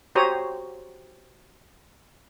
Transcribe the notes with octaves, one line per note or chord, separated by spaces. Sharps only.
F#4 G4 C5 C#5 A#5 D#6